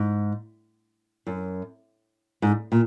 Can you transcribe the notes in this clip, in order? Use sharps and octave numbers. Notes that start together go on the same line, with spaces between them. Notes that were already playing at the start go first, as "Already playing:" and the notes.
Already playing: G#2
F#2
G#2
A#2